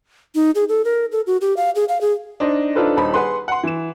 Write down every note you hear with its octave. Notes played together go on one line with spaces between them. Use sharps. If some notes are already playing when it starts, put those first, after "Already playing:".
D#4
G#4
A4
A#4
A4
F#4
G4
F5
G#4
F5
G#4
D4 D#4 C5 D5 D#5
D4 D#4 F4 A4 B4 C5
D#1 D#4 C5 B5
G#4 B4 F#5 C6
F#5 C6
E3 E7